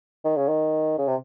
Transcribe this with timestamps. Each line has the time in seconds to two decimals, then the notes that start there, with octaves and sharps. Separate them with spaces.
0.25 D#3
0.37 C#3
0.48 D#3
0.98 C#3
1.07 C3